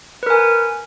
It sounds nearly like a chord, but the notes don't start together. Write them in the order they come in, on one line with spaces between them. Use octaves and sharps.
B4 A#4 G#5